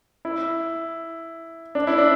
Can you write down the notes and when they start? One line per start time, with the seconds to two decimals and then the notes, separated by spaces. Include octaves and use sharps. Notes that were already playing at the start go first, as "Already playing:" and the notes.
0.25 E4
1.75 D4
1.87 E4
1.98 D4